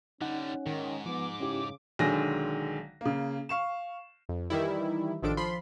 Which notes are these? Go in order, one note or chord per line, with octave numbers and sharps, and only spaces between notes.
D3 G3 C#4 D#4 F#5
G#2 D#3
F3 B3 D6
C#3 C#4 E4 G4
B1 D3 D#3 G#3 G#5 A#6
C#3 A#3
F5 C#6 E7
F2
D#3 E3 G3 E4
A1 D#3 F3 D4 A4 D7
F3 B5 C6